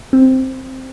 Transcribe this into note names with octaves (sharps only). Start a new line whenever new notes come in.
C4